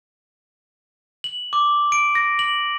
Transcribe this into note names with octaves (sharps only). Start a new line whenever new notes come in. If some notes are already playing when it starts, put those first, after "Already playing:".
F#7
D6
D7
A#6
F#7